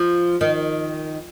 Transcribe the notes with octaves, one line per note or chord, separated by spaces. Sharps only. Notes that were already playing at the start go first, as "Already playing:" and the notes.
Already playing: F3
D#3